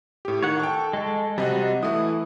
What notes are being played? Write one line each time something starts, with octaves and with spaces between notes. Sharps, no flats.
A2 G4
D#3 C#5 F#5
A4 G5 C#6
G#3 A4
C3 G3 F#4 D#5
E3 A3 E4 D#6